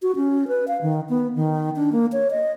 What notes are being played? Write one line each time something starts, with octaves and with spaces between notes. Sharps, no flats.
F#4
C#4
B4
F5
D#3
B3
D#3
D4
A#3
C#5
D#5